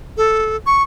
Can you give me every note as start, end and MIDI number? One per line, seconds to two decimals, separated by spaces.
0.17 0.56 69
0.67 0.83 85